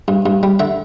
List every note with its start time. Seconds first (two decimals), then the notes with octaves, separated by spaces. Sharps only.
0.08 G2
0.26 G2
0.43 G3
0.59 D3 E5